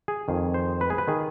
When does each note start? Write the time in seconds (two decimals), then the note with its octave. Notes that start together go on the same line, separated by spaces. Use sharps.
0.08 G#4
0.28 F2 D#3
0.54 C5
0.81 B4
0.90 G#4
0.98 B4
1.08 D#3 G#4